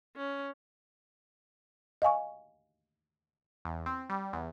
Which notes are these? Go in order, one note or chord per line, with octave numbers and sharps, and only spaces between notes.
C#4
D#5 F5 G#5 C#6
E2
C4
G3
E2